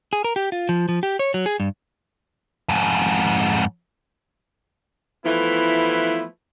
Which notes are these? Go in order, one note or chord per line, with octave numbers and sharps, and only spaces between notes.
G#4
A#4
G4
F4
F3
F3
G4
C#5
F#3
G#4
G2
F2 G#2
E3 F3 A3 B3 E4